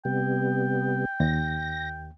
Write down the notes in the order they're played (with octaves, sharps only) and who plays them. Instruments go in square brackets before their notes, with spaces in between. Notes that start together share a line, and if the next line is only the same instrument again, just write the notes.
[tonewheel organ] C3 G3 B3 [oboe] G5
[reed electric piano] D#2 [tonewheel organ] A#6